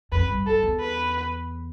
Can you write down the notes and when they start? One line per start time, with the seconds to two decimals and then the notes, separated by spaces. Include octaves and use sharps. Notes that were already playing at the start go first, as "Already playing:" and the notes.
0.12 F2 B4
0.29 G2
0.46 G2 A4
0.63 E2
0.80 B4